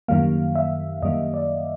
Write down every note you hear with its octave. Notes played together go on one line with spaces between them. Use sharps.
F#2 D#3 G3 A#3 F5
E5
F#2 D#3 G3 A#3 D#5
D5